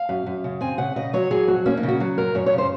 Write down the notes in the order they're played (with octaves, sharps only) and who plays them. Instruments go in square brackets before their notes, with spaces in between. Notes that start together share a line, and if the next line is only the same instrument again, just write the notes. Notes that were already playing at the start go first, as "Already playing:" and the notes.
Already playing: [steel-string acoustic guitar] F5
F#2
F#2
C#3
C4 G#5
C#3 F#5
C#3 D#5
F#3 C#5
F#3 G#4
F2 F#4
A#3 C#4
D#4
C#3
F#4
F#3
F#2 A#4
F#2 C#5
C#5
C#3
C5